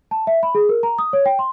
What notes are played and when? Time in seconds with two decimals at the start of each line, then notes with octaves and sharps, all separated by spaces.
0.11 A5
0.27 E5
0.43 B5
0.55 G#4
0.69 A#4
0.83 A#5
0.99 D#6
1.13 C#5
1.26 G5
1.39 C6